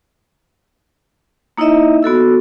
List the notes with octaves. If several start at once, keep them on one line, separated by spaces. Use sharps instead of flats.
A#3 D#4 E4 C#5 D#5 E5
B3 F#4 A4 E6